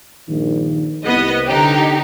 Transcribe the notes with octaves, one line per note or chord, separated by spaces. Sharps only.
A#1 G2 D#3
C2 B3 D#5
D3 D#4 G4